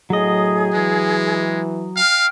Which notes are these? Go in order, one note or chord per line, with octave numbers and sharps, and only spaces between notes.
A2 F#3 G#4 D#5
E3 G#3
F5 G5 F6